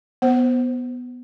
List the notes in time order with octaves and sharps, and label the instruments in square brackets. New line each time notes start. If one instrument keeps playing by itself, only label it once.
[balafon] B3 C5